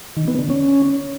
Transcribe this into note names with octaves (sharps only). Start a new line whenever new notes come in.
D#3
B3
D3
C#4